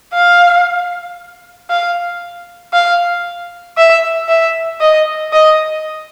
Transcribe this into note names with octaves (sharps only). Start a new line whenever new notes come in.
F5
F5
F5
E5
E5
D#5
D#5